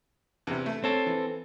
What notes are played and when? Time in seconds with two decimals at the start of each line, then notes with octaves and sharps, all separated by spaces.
0.47 E2 C3
0.66 A3
0.84 C4 A4 C#5
1.06 E3